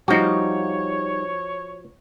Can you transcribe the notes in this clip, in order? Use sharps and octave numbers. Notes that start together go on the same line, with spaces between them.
F3 G3 D#4 F#4 C#5